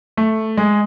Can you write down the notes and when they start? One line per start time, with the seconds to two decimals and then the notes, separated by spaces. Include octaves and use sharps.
0.17 A3
0.58 G#3